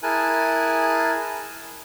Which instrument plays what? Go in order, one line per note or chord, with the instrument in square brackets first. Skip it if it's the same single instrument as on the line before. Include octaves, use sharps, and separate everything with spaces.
[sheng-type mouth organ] E4 G#4 A#4 G#5 A5 F#6